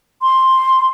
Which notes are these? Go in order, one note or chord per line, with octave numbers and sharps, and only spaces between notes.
C6